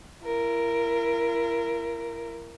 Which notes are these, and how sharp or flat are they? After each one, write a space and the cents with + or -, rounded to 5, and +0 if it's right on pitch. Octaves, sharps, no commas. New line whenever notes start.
E4 +40 A#4 +0